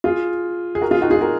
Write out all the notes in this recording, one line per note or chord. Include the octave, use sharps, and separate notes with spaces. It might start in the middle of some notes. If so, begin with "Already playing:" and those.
F4 G#4
G#4
F#4 A#4
F4 G#4
D#4 F#4
F4 G#4
F#4 A#4